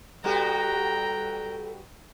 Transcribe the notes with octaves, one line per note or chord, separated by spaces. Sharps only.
G3 B3 F#4 A4 G5 A#5